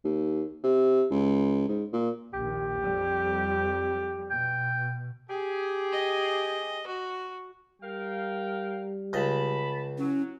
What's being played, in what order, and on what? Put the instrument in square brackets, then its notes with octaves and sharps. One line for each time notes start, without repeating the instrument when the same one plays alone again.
[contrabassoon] D#2
C3
C#2
G#2
A#2
[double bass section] A#1 D#2 [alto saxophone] G4
[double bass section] F2 G3
[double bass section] B2 [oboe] G5
[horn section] G4 G#4
[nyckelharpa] D#5
F#4
[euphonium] G3 [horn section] A#4 F5 G5
[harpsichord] C#2 D#5 [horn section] A5 B5
[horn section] F#3 [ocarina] C#4 [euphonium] E4